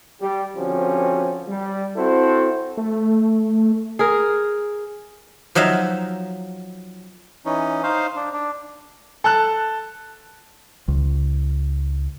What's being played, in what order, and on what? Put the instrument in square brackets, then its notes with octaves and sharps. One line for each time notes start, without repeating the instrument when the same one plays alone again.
[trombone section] G3 G4
D3 F3 C4 C#4 F#4 G4
G3
C4 E4 F#4 A4 C5
[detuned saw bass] A3
[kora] G#4 A#4
[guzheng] F3 F#3 D#4 E5 F5
[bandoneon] E3 C#4 D#4
D#4 C5 F5
D4
D4
[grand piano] A4 A5 F#6
[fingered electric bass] C#2